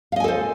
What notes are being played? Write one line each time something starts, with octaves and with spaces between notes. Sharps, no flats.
A4 C5 D#5 F5 G#5